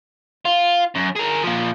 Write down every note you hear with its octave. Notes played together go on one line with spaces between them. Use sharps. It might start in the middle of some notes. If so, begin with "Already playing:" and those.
F4
F#2
G#4 A#4
A#2 F3